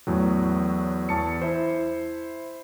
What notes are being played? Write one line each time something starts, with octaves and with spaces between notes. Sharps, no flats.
E2 A2 F#3
E2 A5 C#7
E4 C5